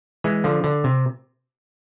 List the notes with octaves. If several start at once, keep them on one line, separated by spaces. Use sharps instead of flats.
E3 G#3
D3 F3
D3
C3